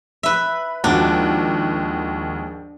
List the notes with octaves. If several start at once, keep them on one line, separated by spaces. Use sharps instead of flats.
B4 E5
D#2 G#2 F3 D4 F#4